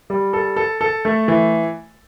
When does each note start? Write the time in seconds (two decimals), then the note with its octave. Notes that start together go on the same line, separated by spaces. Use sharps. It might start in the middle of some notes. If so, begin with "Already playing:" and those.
0.10 G3
0.33 A4
0.56 A4
0.81 A4
1.05 A3
1.28 E3